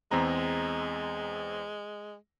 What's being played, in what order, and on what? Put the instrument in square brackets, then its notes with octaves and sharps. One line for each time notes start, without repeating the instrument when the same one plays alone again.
[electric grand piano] E2 C4 A#5 [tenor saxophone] G#3